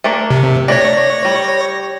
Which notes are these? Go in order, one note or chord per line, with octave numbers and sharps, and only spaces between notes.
A3 A#3 D4
C3
A3 D4 C#5 A#6
G3